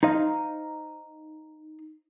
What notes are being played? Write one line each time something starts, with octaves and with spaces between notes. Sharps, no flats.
D#4 C5 D#5 F5